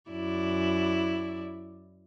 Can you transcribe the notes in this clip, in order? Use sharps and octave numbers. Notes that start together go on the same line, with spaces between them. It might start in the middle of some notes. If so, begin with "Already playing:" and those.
F#2 E4 D5